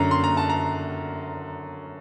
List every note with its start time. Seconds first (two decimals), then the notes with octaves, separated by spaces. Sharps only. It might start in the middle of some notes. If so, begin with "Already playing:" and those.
Already playing: F#2 D3 A#5
0.11 C6
0.24 A#5
0.37 A5
0.50 A#5